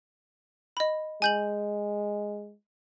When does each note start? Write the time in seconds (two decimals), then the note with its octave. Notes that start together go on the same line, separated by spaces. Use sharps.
0.77 D#5 B5
1.22 G#3 G#5 G6 F#7